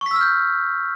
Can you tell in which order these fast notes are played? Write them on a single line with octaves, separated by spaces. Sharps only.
C#6 B6 E6 F6 G6